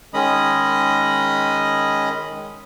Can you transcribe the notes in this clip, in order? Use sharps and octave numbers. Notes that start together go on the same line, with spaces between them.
D#3 G#3 C#4 D#5 B5 D#6